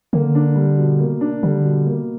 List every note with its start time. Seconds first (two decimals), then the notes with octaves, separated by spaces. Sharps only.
0.13 D3 A#3
0.35 D4
0.55 G3
0.78 B2
0.99 A#3
1.21 D4
1.43 D3 G3
1.64 B2
1.86 A#3